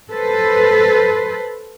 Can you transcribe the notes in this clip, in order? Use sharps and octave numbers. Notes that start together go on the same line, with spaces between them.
A4 B4 C5